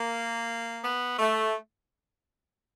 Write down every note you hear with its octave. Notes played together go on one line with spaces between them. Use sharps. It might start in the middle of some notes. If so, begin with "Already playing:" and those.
Already playing: A#3
B3
A3